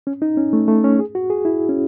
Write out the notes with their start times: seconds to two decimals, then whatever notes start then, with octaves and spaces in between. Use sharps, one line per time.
0.07 C#4
0.22 D#4
0.37 C#4
0.53 A3
0.68 A3
0.84 C#4
0.99 G#4
1.15 F#4
1.30 G#4
1.45 E4
1.69 C#4